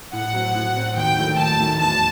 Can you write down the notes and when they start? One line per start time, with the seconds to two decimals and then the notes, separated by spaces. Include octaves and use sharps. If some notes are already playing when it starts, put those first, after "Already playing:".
0.13 A2 F#5
0.33 F#3 C4
0.55 A2
0.76 F#3 C4
0.96 D#2 G5
1.18 D#3 F#3 A3 E4
1.39 D#2 A5
1.60 D#3 F#3 A3 E4
1.81 E2 A5